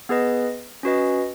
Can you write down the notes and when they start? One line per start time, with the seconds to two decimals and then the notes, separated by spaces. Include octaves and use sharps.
0.09 B3 G#4 B4 D#5
0.83 C#4 F#4 B4 D#5